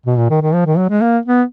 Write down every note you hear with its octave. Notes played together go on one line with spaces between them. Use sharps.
B2
A#2
D#3
D#3
F3
D#3
F#3
G#3
A#3
B3